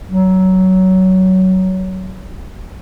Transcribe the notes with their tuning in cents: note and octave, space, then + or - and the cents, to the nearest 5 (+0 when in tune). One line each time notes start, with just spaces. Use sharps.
F#3 +15